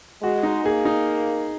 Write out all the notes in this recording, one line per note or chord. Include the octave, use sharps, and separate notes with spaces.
G#3 F#4
D#4
A#3 G#4
D#4